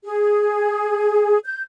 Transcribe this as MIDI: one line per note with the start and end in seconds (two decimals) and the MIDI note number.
0.05 1.38 68
1.45 1.61 91